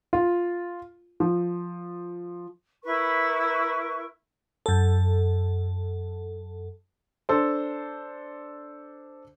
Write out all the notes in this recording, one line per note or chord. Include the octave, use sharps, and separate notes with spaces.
F4
F3
E4 A#4 B4 C#6
F#2 A4
D4 A4 C5